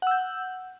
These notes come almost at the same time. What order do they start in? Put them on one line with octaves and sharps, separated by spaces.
F#5 E6 G6